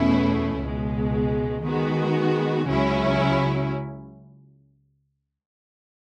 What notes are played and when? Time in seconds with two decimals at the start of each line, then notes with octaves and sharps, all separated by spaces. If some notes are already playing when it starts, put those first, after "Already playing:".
Already playing: E2 B2 A3 C#4 E4
0.59 C#2 B2 G#3
1.62 D#3 G#3 B3 F#4
2.66 C#2 C#3 F#3 C#4 E4